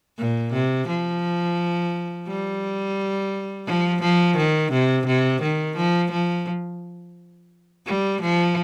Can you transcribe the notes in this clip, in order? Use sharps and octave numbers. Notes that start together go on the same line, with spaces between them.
A#2
C3
F3
G3
F3
F3
D#3
C3
C3
D#3
F3
F3
G3
F3